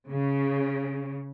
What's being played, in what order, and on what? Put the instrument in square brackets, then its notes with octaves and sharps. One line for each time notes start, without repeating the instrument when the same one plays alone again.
[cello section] C#3